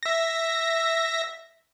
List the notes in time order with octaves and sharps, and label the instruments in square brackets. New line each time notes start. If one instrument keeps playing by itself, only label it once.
[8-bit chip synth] E5 A#6